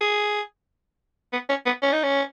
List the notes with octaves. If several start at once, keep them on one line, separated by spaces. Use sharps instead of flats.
G#4
B3
C#4
B3
C#4
D#4
C#4